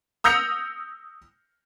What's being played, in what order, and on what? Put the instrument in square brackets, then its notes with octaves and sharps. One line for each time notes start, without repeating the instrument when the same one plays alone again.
[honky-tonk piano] D#6 E6 G6 A#6 C#7 F7